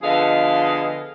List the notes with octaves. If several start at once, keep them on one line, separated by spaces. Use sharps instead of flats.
D3 F3 B3 G#4 D#5 F5